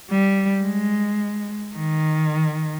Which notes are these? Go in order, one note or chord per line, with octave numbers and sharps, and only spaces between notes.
G3
G#3
D#3